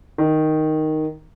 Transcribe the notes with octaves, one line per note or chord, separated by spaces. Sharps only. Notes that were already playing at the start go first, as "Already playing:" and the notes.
D#3